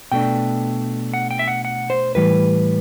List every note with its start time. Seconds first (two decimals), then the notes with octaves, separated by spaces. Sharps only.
0.12 B2 A3 D4 G5
1.14 F#5
1.31 G5
1.39 E5
1.48 F#5
1.65 F#5
1.90 C5
2.15 A2 E3 G3 B4